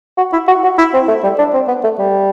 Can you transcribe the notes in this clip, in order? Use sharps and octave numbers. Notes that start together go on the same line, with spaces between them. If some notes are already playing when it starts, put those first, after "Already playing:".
F#4
E4
F#4
F#4
E4
C4
A3
G3
D4
C4
B3
A3
G3